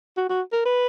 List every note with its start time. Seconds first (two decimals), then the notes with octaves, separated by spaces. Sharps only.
0.17 F#4
0.29 F#4
0.52 A#4
0.65 B4